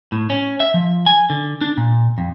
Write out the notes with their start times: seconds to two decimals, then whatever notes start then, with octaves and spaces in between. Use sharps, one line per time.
0.12 A2
0.30 C#4
0.60 E5
0.74 F3
1.06 G#5
1.30 D3
1.61 D4
1.78 A#2
2.18 F2